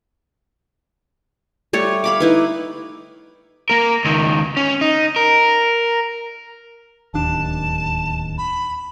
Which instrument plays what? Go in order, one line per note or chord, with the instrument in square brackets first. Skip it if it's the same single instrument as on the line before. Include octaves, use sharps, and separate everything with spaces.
[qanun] G3 A3 C#5
F5 B5 D6
D#4 E4 B4
[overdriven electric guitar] A#3 A#4
C#2 D#3
C#4
D#4
A#4
[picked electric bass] D1 D#2 D4 [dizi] A5
[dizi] B5